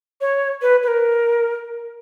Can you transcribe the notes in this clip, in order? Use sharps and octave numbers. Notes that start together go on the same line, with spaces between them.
C#5
B4
B4
A#4